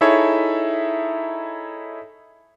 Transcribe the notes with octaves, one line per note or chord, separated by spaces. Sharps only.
D#4 E4 G#4 A4 C#5 E5